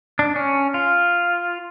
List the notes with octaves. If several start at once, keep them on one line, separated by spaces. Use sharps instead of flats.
D4
C#4
F4